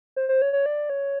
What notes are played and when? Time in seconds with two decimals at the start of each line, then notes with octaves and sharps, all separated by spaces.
0.16 C5
0.29 C5
0.42 C#5
0.53 C#5
0.66 D5
0.90 C#5